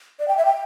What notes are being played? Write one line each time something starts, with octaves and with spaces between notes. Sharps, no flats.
D5
G5
E5
G5